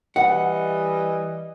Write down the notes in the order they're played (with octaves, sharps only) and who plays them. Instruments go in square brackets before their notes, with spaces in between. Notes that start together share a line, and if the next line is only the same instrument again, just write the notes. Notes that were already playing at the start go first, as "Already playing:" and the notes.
[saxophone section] E3 G3 D#5 [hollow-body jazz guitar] F#5